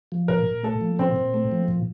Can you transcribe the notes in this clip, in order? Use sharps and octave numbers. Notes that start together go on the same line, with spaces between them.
F3
A#2 A#4
A#2
A3 A4
F3
A#2 C4
A#2
A3
F3
A#2